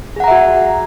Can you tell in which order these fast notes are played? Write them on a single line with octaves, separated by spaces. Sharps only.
G#4 F#5 A#5 E5 F#4